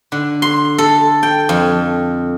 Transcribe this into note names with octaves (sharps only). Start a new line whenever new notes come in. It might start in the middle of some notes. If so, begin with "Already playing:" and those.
D3
C6
A4
G5
F2